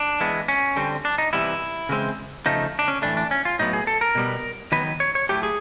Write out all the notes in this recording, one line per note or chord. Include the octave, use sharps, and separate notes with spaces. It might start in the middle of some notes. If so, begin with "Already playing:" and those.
Already playing: D4
E3 G#3 B3
C#4
D3 G3 C4
D4
D#4
C3 E3 G3 B3 E4
C#3 E3 G#3 C4
C#3 F3 A3 D#4
D4
C#4
A2 E3 A3 D4
D4
C#4
F4
A2 F#3 B3 D#4
G#4
A4
A#4
B2 G3 B3
D#3 F#3 B3 B4
C#5
C#5
A2 F#3 A3 G4
G#4